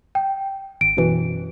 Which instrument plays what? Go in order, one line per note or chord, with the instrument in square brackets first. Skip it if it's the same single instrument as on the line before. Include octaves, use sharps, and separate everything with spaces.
[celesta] G5
[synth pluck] G#1 [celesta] D7
[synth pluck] F#2 B2 E3